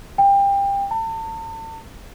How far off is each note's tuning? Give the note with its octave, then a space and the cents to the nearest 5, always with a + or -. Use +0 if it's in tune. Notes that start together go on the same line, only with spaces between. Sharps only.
G5 +25
A5 +40